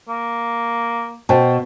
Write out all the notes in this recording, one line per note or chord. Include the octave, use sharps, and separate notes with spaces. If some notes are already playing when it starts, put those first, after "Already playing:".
A#3
B2 C5 G5 A5